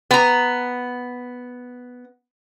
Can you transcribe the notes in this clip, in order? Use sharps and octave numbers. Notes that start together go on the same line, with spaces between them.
B3 A#5